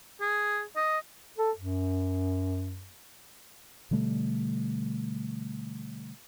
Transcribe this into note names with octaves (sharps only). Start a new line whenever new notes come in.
G#4
D#5
A4
F#2
B2 D3 G3 A3